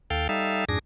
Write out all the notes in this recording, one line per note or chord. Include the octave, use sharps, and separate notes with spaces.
D#2 A4 F5 G5
G3 D#4 A4 E5 F5
F2 G#2 D4 G#4 A#6